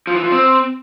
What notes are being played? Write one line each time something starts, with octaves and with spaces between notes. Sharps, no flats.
F3
E3
F3
C4